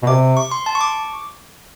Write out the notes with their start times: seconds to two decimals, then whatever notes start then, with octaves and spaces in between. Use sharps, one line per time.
0.03 B2
0.07 C3 D6
0.37 C#6
0.51 C6
0.66 A5
0.75 C#6
0.81 D6